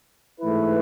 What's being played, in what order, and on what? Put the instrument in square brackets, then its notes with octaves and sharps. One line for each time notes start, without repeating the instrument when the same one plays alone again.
[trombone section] G#2 E3 A3 E4 B4